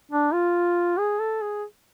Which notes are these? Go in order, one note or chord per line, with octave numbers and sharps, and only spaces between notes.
D4
F4
G#4
A4
G#4